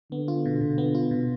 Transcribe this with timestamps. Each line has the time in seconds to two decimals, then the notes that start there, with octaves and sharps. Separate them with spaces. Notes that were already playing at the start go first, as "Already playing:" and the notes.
0.11 D3 B3
0.28 F4
0.46 B2
0.61 B2
0.78 B3
0.95 F4
1.11 B2